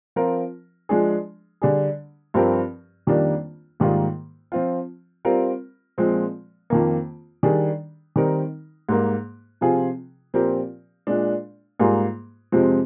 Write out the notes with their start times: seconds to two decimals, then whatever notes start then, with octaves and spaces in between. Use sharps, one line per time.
0.16 F3 C4 F4 A#4
0.89 F3 G#3 D4 G#4
1.62 D3 G3 D4 G#4
2.34 G2 F3 C4 G4 A#4
3.07 F2 D#3 G3 A#3 D4
3.80 G#2 D#3 G3 A#3 F4
4.52 F3 C4 F4
5.25 G3 C4 F4 A#4
5.98 A#2 F3 G#3 C4
6.70 F2 D#3 A#3
7.43 D#3 G3 D4 G#4
8.16 D#3 G3 C4 D#4 A#4
8.89 G#2 G3 A#3
9.61 C3 F3 C4 F4 G#4
10.34 A#2 F3 C4 G4 A#4
11.07 A#2 G#3 D4
11.79 G#2 G3 A#3 F4 G#4
12.52 F2 C3 F3 G#3 C4